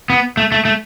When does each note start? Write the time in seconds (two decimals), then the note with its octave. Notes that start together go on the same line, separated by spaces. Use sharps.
0.10 B3
0.37 A3
0.52 A3
0.65 A3